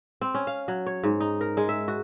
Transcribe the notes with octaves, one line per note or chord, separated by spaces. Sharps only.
C4
C#4
F5
F#3
C#5
G#2
D#4
A#4
G#3
E5
F#4